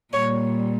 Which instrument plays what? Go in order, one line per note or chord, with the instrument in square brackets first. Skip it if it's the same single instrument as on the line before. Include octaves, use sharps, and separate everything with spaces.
[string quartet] A#2 G3 C#5